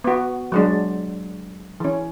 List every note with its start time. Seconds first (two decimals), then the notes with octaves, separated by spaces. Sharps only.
0.04 B3 F#4
0.52 F#3 G#3 D4
1.80 E3 C#4